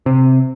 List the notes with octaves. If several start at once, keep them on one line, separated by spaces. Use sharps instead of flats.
C3